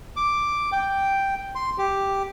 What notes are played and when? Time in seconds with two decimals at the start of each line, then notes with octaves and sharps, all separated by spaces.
0.16 D6
0.72 G5
1.55 C6
1.78 G4